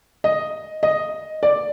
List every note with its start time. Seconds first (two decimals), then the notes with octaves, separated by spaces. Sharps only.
0.24 D#5
0.83 D#5
1.43 D5